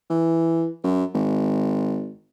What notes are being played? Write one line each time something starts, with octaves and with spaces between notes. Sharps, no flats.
E3
F#2
G#1